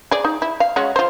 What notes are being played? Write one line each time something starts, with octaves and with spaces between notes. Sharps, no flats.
G#4 D5
D#4
E4
F5
G#3 C#4 F#4
F4 C5